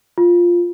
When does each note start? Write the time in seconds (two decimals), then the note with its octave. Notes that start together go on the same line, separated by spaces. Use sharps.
0.18 F4